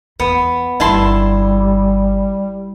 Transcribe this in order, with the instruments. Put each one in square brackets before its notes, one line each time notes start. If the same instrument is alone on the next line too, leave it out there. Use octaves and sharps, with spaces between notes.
[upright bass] E2 [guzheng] B3
[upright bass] G1 E3 [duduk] G3 [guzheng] E4 A5 C6